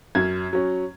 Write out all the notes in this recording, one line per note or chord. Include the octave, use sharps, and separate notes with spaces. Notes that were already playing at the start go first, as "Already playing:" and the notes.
F#2 G#6
F#3 C#4